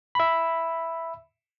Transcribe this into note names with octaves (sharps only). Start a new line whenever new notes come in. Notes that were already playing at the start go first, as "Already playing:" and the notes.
E5 B5